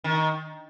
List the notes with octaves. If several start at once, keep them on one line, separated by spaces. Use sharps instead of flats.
D#3